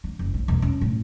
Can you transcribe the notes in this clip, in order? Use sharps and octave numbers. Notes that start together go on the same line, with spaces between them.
D3
F#1
B1
E1
C#4
A2